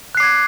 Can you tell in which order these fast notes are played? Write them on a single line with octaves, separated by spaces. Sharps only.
F#6 C7 D6 G#6